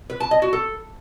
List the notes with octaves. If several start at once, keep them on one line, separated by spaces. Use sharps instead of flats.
B4
A5
D#5
F#4
A4